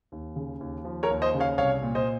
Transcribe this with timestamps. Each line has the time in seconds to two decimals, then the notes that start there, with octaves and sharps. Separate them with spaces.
0.12 D#2
0.36 C#3
0.61 D#2
0.85 F3
1.03 A#4 C#5
1.10 D#2
1.22 C5 D#5
1.34 C#3
1.40 C#5 F5
1.58 C2 C#5 F5
1.83 A#2
1.95 C5 D#5